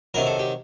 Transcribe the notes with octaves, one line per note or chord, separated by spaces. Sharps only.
C3 D#3 F#3 A#4
A4
G4